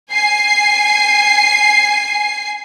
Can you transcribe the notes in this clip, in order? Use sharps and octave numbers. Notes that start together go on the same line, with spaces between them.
G#5 C7